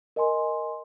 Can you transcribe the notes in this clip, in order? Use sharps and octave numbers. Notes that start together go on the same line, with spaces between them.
A#4 D#5 G#5 C6